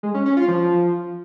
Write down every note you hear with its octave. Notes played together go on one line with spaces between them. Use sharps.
G#3
C#4
C#4
F4
F3